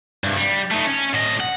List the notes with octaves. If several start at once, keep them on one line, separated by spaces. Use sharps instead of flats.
C2 G2
G3
A3 D#4
C#4
A2 D#5
F#5